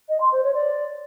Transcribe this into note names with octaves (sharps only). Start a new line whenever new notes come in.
D#5
C6
C5
C#5
D5